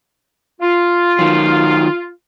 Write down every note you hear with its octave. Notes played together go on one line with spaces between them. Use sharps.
F4
D#3 F#3